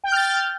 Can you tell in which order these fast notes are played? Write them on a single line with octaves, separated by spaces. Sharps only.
G5 G6 F6 A6